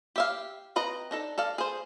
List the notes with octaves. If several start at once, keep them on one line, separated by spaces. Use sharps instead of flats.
G4 E5 F5
C4 B4 D#5 A#5
D4 D#4 A4
A4 D5 F5
G#4 C5